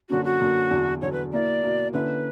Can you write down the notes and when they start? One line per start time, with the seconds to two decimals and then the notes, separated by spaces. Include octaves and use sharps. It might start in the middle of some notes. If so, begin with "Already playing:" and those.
0.10 F#2 D3 A#3 C#4 F#4
0.25 F#4
0.40 F#2 D3 A#3 C#4
0.71 E2 D3 F#3
1.02 E2 D3 F#3 C#5
1.12 B4
1.32 B2 A#3 E4 D5
1.63 B2 A#3 E4
1.93 D3 A#3 C#4 E4 B4